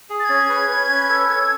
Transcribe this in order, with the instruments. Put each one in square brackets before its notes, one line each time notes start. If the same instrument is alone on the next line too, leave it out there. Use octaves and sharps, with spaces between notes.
[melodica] G#4
[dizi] A6
[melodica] C#4 [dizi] G#6
[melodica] B4
B4
C#4
A4
A4